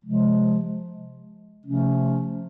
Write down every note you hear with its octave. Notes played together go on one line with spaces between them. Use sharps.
C3 F3 G#3
C3 F3 A3 C#4